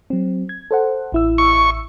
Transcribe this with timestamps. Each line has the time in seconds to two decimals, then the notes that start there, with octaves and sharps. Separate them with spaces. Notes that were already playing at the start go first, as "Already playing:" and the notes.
0.10 F#3 C4
0.49 G#6
0.71 A4 C5 F#5
1.12 A1 E4 E6
1.38 C#6